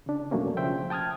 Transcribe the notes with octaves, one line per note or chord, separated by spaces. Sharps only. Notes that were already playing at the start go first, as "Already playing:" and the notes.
C#3 D4
F2 B2 F#3 A3 A#3 C#4
C#3 F3 C5 E5 G5
G5 A5 D#6 F6 G#6